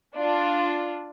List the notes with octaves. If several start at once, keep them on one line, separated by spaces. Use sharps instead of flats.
D4 F4